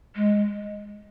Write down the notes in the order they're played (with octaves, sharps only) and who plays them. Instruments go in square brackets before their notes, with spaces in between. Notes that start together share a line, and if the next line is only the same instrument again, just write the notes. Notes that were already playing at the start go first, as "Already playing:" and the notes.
[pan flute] G#3